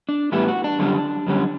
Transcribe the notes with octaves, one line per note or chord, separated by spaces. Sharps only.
D4
A2 E3 G3 B3 E4
F#4
D4
F#2 D3 G3 C#4
F#2 D3 G3 C#4